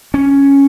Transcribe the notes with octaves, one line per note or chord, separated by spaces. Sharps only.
C#4